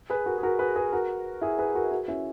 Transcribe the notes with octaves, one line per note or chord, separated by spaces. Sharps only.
G#4 B4
F#4 A#4
G#4
F#4 A#4
G#4 B4
G#4 B4
F#4 A#4
E4 G#4
G#4 B4
F#4 A#4
F#4 A#4
C#4 E4